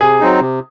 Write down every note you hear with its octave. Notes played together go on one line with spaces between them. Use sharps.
C3 G#4
F#3 C4 D#4
C3